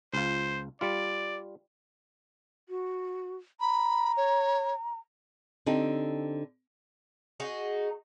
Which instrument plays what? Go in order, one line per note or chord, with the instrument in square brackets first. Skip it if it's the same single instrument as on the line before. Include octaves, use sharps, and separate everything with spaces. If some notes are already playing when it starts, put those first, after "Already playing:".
[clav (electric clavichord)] C#2 F4 [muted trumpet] C5
[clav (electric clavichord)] G3 F4 [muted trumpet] D5
[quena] F#4
[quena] A#5 [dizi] B5
[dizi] C#5
[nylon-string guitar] D3 C4 D#4 G4
[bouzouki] D#4 F#4 G#4